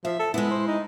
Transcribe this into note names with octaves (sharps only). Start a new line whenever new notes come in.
F3 E5
A4
G#3 B3 E4
C5
D#4